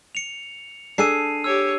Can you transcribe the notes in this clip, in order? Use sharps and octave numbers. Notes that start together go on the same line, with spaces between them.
C#7 F7
D4 G#4 A4 C7 D#7
G4 C#5 E6